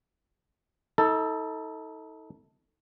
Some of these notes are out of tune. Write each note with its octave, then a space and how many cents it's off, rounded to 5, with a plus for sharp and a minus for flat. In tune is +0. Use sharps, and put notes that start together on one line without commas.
D#4 +40 A4 +10